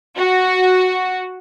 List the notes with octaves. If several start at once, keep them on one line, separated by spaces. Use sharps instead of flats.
F#4